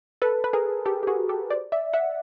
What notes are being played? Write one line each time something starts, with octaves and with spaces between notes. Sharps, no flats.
A4 B4
B4
G#4 A#4
G4 A4
G4
F#4 G#4
G4 A4
C5 D5
D5 E5
E5 F#5